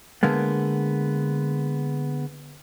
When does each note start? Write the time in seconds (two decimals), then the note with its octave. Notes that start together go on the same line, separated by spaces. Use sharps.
0.23 D3 G#3 A#3 B3